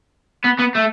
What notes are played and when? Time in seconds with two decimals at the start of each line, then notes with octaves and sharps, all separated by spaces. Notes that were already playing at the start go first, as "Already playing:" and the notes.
0.44 B3
0.59 B3
0.75 A3